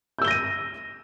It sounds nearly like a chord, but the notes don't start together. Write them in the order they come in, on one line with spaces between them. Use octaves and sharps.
G6 E6 G7 A#6 D#7